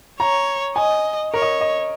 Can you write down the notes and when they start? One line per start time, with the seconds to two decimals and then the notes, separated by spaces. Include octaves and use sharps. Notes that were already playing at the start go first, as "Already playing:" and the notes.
0.20 C#5 A#5
0.76 D#5 G#5
1.33 A#4 C#5
1.42 D#5
1.61 D#5